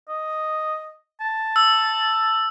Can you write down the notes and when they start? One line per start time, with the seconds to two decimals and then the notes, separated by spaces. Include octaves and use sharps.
0.08 D#5
1.20 A5
1.56 E6